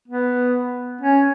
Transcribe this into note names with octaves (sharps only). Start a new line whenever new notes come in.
B3
C#4